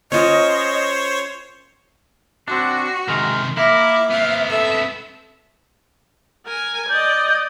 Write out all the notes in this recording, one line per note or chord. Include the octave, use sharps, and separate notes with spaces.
C#4 F4 A#4 C5 C#5 D#5
C4 D4 F#4
C3 D#3 G#3 A#4
A#3 E4 A#4 E5 D6
B3 C4 F5
A4 E5
A#4 G#5
D5 D#5 G6